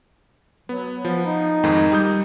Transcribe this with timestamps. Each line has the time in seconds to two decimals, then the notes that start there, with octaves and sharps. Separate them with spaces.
0.69 F#3 B3
1.05 F3 B3
1.25 D#4
1.64 F2 G#2 D#3
1.92 G3 D#6 G6